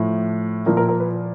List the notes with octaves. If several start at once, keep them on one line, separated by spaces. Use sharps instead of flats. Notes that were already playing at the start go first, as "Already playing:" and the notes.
Already playing: A2 F3
A#2 F3 A#4
A#4
A#4
B4